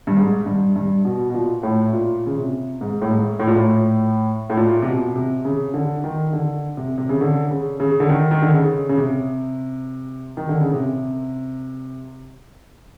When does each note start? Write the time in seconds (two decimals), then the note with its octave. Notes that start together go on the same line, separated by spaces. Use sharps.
0.07 G2
0.17 G#2
0.46 G2
0.75 G2
1.05 B2
1.30 B2
1.34 A#2
1.63 A2
1.93 A#2
2.26 C#3
2.37 C3
2.81 G#2
3.02 A2
3.11 G#2
3.40 A2
3.47 A#2
3.55 A2
4.50 A2
4.57 A#2
4.82 C3
4.86 B2
5.16 C3
5.45 C#3
5.74 D3
6.04 D#3
6.33 D3
6.77 C3
6.98 C3
7.09 C#3
7.21 D3
7.51 C#3
7.80 C#3
8.00 D3
8.09 D#3
8.31 D#3
8.42 D3
8.53 C#3
8.89 C#3
8.97 C3
10.37 D#3
10.49 D3
10.61 C#3
10.73 C3